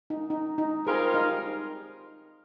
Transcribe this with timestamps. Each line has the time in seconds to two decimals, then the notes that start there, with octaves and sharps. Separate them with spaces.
0.10 D#4
0.30 D#4
0.58 D#4
0.86 G3 C4 F4 G#4 A#4
1.14 D#4 D#5